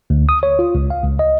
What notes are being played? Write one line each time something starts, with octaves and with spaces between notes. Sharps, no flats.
D2
D#6
C#5
F4
C#2
F5
C#2
D#5